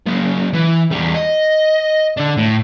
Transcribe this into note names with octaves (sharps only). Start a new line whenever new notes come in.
F#3 A#3
E3
E2 G3
D#5
D3 D4
A2